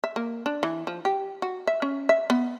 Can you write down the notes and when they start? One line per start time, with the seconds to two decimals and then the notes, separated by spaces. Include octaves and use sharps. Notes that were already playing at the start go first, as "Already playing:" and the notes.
0.04 E5
0.16 A#3
0.46 D4
0.63 E3
0.87 F3
1.05 G4
1.42 F#4
1.67 E5
1.82 C#4
2.09 E5
2.30 B3